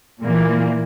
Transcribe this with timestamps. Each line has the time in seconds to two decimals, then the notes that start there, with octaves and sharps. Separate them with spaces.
0.22 A#2 E3 A#3